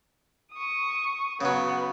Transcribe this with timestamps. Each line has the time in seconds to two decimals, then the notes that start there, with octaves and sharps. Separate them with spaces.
0.53 C#6 D#6
1.41 C#3 F#3 B3